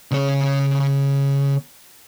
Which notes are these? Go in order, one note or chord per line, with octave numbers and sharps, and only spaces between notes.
C#3 C#5